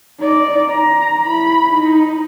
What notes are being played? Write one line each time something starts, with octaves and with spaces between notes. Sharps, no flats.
D#4 D5
A#5
E4 B5
D#4